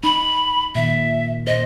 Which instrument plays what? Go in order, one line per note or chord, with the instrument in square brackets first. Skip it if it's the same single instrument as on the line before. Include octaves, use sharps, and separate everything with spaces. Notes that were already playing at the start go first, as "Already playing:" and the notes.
[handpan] D#4 [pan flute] B5
[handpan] A#2 D#3 [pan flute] E5
[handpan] A#2 C5 [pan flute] D#5